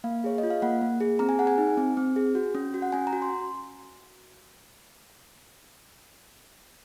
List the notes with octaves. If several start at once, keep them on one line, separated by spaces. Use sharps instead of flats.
A#3 F5
G#4 C#5
D#5
F4
F5
A#3 F#5
A#3
G#4
C4 A#5
G#5
G#4 F#5
G#5
D#4
C4
C4
G#4
F#4
C#4
F#4
F#5
C#4 G#5
A#5
F#4
C6